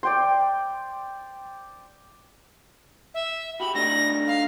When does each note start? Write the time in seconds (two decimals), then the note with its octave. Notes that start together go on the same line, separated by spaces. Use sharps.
0.03 D5 G5 C6
3.14 E5
3.60 F#4 G4 B5
3.75 A3 D4 D#4 A#6
4.28 F5